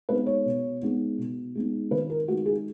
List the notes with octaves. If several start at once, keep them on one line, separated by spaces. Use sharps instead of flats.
G#3 B3 D#4 B4
C#5
B2
G#3 B3 D#4
B2
G#3 B3 D#4
D#3 B4
A#4
G#3 D#4 F#4
G#4